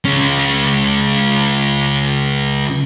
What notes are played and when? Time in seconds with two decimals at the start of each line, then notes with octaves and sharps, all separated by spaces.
0.05 C#2 C#4